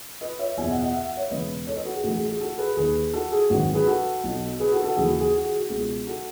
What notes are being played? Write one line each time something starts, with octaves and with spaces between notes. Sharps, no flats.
B4 D#5
C#5 E5
F#1 E2 B2 E5 G#5
D#5 F#5
D#5 F#5
E5
F#5
C#5 E5
E1 E2 C#3 E3 B4 D#5
A4 C#5
B4 D#5
F#4 A4
G#4
A1 A2 E3 F#4 A4
G#4
A4
G#4
F#4 A4
G#4 B4
D#2 D#3 G#4 B4
F#4 A4
G#4
G#1 F#2 D#3 F#4
G#4 B4
F#4 A4
B1 B2
G#4 B4
F#4 A4
F#4 A4
D#2 C#3 E3 G#4
F#4
G#4
F#4
G#4
F#4
C#2 B2 G#4
F#4 A4